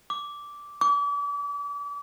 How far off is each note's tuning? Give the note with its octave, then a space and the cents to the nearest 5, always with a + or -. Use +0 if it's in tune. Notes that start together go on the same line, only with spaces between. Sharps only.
D6 -10
D6 -40